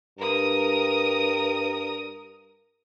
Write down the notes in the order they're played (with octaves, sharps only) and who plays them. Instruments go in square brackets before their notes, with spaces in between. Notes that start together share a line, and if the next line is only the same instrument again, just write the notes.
[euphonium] G2 [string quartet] A#4 D#6